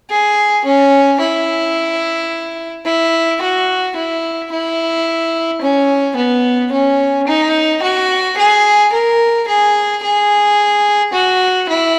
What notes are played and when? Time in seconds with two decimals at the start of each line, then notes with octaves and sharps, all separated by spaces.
0.10 G#4
0.65 C#4
1.20 E4
2.86 E4
3.42 F#4
3.96 E4
4.52 E4
5.61 C#4
6.17 B3
6.72 C#4
7.28 D#4
7.83 F#4
8.38 G#4
8.93 A#4
9.48 G#4
10.03 G#4
11.14 F#4
11.69 E4